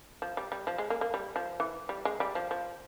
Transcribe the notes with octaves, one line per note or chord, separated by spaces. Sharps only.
F3
G3
G3
F3
G#3
A#3
A#3
G3
F3
E3
G3
G#3
G3
F3
F3